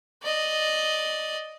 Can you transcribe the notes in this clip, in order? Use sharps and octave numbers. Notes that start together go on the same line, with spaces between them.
D5 D#5